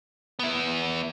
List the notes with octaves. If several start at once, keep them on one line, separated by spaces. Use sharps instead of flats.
B3 E4